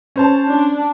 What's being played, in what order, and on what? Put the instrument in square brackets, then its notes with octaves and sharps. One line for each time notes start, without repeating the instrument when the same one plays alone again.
[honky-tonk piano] C#4 C5 A5
[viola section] D4